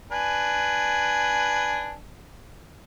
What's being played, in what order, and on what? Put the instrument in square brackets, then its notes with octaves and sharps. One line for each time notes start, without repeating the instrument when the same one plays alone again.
[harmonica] D4 B4 G#5